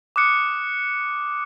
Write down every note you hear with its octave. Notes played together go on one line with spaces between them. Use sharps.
D6 D#6 F#6 C#7